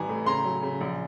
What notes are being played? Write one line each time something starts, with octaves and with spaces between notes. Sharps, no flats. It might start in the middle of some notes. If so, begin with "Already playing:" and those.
Already playing: A1 E3 G3 G#5 A#5
A2
C#3 A#5 C6
F#3
C#3
A#1